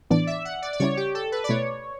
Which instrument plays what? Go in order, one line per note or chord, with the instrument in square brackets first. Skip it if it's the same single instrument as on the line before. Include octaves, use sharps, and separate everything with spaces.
[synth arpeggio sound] A2 E3 B3 D4 [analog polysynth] D5
[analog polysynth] E5
F#5
D5
D5
[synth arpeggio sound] C#3 G3 C#4 E4 [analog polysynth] C#5
[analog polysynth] G4
A4
B4
D5
[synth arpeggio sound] B2 A3 E4 [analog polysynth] C#5